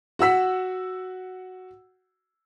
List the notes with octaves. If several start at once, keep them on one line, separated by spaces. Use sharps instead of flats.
F#4 F#5 E6 B6